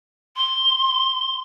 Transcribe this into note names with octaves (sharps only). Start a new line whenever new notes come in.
C6